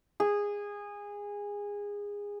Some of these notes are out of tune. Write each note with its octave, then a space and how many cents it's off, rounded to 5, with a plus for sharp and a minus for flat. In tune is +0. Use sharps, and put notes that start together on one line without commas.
G#4 -20